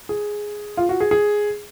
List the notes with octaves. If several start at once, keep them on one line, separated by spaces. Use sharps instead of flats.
G#4
F4
F#4
G#4
G#4